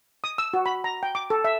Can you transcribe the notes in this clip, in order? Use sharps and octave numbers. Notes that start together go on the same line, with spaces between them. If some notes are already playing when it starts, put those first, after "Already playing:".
D#6
E6
F#4
B5
A#5
G5
D6
A4
E5